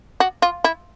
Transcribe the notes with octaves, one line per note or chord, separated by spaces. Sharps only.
F#4
F4
E4